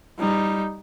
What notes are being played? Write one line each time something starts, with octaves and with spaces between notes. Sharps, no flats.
G3 D#4